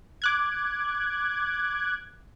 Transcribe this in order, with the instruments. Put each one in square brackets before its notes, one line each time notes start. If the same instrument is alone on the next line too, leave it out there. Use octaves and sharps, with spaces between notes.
[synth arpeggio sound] D6 F#6 G#6